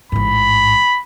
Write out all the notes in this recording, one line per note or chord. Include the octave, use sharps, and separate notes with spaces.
A1 G#2 B5